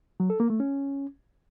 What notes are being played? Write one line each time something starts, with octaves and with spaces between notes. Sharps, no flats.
F#3
A4
A#3
A3
C#4